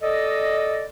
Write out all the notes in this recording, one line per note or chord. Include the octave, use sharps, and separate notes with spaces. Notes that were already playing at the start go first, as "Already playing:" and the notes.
A4 D5 D#5